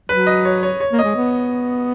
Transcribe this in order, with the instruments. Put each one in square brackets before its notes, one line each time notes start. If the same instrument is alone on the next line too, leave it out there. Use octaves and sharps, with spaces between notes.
[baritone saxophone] F#3 [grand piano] B4
[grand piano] D#5
C#5
C#5
C#5
[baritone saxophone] A#3
[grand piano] D#5
[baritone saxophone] G#3
B3